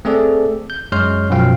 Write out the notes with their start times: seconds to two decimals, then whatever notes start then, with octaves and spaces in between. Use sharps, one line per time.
0.05 A3 C4 G#4 A4 D5
0.70 G6
0.92 F#2 G#3 C#5 C6 F6 G6
1.30 F#2 B2 F3 F5 G5